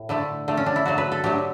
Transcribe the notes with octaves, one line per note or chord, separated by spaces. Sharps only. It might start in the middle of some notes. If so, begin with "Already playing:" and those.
Already playing: A2 F#4
D3 A3 E4
D3 A3
C#4
D4
E4
D3 F#3 A3 F#4
B4
A4
D3 F#3 A3 G4